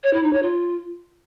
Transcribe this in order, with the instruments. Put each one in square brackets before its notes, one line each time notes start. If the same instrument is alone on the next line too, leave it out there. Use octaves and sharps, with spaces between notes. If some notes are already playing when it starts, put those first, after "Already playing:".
[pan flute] C#5
E4
D#4
C#5
F4